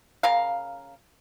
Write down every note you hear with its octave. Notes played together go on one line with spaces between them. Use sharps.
C#3 A#4 F5